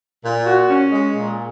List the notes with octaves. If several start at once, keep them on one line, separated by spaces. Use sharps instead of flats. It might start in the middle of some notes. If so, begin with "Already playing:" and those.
A#2
F#4
C#4
G#3
A#2